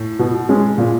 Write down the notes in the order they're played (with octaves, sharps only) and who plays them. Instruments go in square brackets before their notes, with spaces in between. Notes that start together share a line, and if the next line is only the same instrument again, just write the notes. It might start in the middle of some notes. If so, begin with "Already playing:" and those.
Already playing: [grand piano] A2
[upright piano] B2
G#3 C#4
A#2